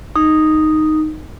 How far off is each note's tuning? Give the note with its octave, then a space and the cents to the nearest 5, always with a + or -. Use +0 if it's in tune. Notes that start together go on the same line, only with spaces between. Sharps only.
D#4 -5